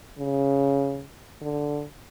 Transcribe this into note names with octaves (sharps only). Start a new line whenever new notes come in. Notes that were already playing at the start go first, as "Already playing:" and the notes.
C#3
D3